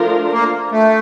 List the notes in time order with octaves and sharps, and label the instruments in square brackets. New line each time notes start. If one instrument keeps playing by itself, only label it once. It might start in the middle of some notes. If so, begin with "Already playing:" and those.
Already playing: [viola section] F3 A3 D4 F4 A#4
[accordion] A#3
A3